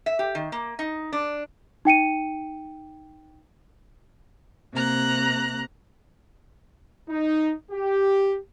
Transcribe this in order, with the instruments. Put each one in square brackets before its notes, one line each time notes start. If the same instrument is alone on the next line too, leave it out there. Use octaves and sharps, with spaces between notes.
[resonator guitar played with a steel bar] E5
G4
D#3
A#3
D#4
D4
[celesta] D#4 G5 C#7 D#7
[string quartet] C3 A#3 A#5 F#6
[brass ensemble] D#4
G4